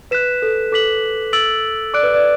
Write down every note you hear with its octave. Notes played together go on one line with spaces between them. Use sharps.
B4 F#6 B6 E7
A4
A4 D6 B6 F#7
E6 A6 D7 F#7
D5 D6 F#6 D7
B4
D5